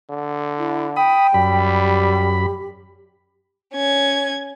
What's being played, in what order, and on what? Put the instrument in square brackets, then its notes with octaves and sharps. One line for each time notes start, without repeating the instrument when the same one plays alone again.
[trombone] D3
[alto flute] E4
[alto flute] G5 [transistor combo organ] B5 D#6
[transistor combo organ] F#2 B5 [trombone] G3
[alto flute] G4
[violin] C#4 G#6